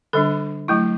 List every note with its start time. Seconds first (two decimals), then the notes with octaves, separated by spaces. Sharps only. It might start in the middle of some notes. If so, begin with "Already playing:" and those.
0.13 D3 G3 D4 A4
0.68 F#3 A3 E4